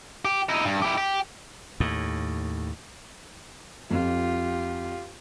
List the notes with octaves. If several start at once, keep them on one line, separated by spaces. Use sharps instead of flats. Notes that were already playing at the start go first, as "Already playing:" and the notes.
G4
D#4 E4
G2
E4 G4
G4
D#2 A2
F2 F4 G4